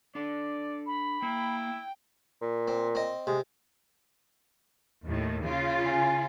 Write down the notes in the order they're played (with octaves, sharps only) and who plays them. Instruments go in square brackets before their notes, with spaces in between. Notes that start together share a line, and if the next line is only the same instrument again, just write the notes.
[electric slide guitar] D4 A4 [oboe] D5
[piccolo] B5
[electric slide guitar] A#3 [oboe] E4 [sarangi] G5
[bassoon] A#2
[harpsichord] C4
C4 D#5
[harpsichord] C3 [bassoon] G#3
[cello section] D#2 A2 D#3
C#3 F4
[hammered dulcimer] G#5